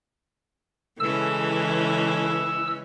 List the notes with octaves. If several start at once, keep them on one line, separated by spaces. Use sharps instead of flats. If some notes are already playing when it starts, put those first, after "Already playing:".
C#3 E3 G#3 C#4 A4 E6